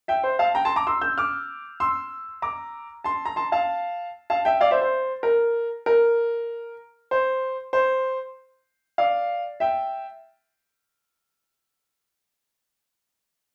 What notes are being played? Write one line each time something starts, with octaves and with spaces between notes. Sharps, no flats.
E5 G5
C5
F5 A5
G5 A#5
A5 C6
A#5 D6
C6 E6
E6 G6
D6 F6
C6 E6
A#5 D6
A5 C6
A#5
A5 C6
F5 A5
F5 A5
E5 G5
D5 F5
C5 E5
C5
A#4
A#4
C5
C5
D5 F5
E5 G5